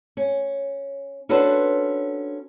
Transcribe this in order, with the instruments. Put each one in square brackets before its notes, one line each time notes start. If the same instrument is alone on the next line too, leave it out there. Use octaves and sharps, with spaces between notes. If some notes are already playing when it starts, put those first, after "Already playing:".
[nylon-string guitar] C#4
C#4 D4 F#4 A4 B4 C5